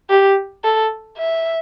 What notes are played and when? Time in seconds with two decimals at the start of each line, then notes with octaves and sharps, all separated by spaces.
0.10 G4
0.64 A4
1.18 E5